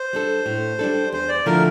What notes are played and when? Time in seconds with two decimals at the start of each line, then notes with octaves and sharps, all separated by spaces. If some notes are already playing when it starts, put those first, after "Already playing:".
Already playing: C5
0.13 G3 D4 A4
0.46 A2
0.79 G3 D4 A4
1.12 E2 C5
1.28 D5
1.46 D3 F3 A3 E4 A#4